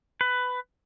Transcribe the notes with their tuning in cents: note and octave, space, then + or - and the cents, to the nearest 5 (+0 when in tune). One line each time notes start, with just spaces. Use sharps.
B4 +15